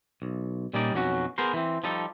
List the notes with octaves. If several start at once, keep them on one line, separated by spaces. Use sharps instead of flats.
B1
A#2 G3 C#4 D#4 D5
B1 F2 F#3 C#4 F#4
B3 G#4 A#4 C5
E3 C4
F3 G3 D#4 A4